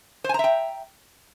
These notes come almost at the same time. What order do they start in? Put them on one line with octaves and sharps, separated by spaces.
C5 G#5 A#5 E5 G5